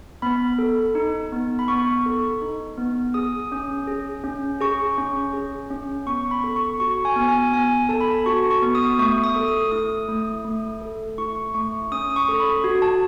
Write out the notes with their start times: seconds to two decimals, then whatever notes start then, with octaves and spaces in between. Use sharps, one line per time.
0.22 B3 B5
0.59 A4
0.95 D#4
1.32 B3
1.59 B5
1.68 B3 C#6
2.06 A4
2.41 D#4
2.78 B3
3.14 G#4 D#6
3.52 C#4
3.87 G#4
4.24 C#4
4.61 G#4 C#6
4.98 C#4
5.33 G#4
5.70 C#4
6.06 B3 C#6
6.31 B5
6.44 A4
6.56 C#6
6.80 F#4 C#6
7.05 G#5
7.16 B3
7.28 G#5
7.53 B3 G#5
7.89 A4 A5
8.01 B5
8.11 A5
8.26 F#4 C#6
8.51 C#6
8.62 B3
8.75 D#6
8.99 A3 C#6
9.24 D#6
9.36 A4
9.48 D#6
9.72 E4 D#6
10.09 A3
10.45 A3
10.81 A4
11.18 E4 C#6
11.54 A3 C#6
11.92 C#4 D#6
12.10 D#6
12.16 C#6
12.28 A4
12.40 B5
12.64 F#4
12.82 A5